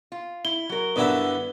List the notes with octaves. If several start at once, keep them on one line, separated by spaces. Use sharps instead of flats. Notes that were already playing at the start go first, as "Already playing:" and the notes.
F4
E4 G7
F#3 A#4
G2 D3 B3 E4 B4